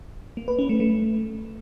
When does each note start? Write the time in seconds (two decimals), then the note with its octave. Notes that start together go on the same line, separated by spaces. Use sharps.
0.37 A#3
0.48 B4
0.59 C#4
0.69 A3
0.80 A3